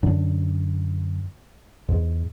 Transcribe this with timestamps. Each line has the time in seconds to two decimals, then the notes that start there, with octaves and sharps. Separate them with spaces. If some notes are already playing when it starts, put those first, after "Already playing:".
0.03 F#2 D3 D4
1.88 E2 G#2